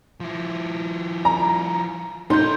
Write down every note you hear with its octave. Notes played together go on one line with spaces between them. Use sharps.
F3 E4
A#5
D#4 A4 C#5 C6 G6